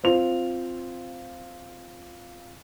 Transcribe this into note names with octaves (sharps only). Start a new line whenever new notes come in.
C4 F4 F7